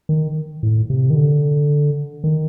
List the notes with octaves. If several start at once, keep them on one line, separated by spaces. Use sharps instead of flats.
D#3
A2
C3
D#3
D3
D#3